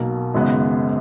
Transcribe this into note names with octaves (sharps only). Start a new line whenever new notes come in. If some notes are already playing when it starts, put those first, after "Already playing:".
Already playing: B1 B2 A#3
G#1 F#2 C#3 G#3 B3